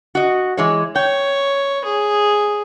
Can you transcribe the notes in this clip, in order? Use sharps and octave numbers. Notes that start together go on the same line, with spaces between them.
F#4 D#5
E3 G#3 C#5
C#5 G5
G#4